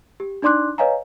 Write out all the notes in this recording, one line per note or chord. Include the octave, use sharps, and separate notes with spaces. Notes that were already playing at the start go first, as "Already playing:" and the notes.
G4
D4 D#4 D5 C6 D6 F#6
B4 C#5 D#5 F5 G#5 A#5